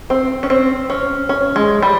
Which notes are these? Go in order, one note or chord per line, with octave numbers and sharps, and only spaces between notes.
C4
C#4
C4
C#4
C#4
G#3
G3